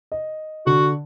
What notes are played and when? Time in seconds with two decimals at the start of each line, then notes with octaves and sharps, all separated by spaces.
0.12 D#5
0.67 D3 F#4